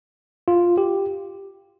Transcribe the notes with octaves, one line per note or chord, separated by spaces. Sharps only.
F4
G4